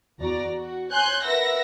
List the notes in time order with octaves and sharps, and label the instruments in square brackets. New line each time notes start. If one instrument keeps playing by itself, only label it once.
[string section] E2 F#4 D5 A#5
F#4
C#5 G#5 C6 F#6 G6
A#4 B4 E5 F#5 E6 A#6